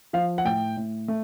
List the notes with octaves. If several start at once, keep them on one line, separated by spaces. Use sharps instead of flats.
F3 F5
F#5
A2 G5
A2
A3